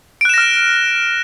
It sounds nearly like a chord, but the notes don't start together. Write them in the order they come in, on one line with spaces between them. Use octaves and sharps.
D7 F#6 E7 A#6 F6